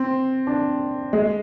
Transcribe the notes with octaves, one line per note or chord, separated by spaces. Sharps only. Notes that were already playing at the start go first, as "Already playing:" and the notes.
Already playing: C4
D4
G#3